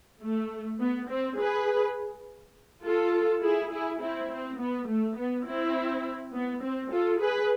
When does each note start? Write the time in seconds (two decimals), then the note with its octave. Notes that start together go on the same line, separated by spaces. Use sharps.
0.22 A3
0.80 B3
1.09 C4
1.38 G#4 B4
2.83 F4 A4
3.42 E4 G#4
3.71 E4 G#4
4.00 C4 E4
4.30 C4
4.59 B3
4.87 A3
5.16 B3
5.46 C4 E4
6.33 B3
6.62 C4
6.91 F4 A4
7.20 G#4 B4